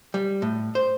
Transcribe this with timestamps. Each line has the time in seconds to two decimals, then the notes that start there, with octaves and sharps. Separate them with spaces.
0.14 G3
0.42 A2
0.75 C5